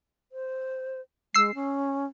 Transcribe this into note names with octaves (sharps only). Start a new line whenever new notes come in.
C5
G#3 E6 C7
C#4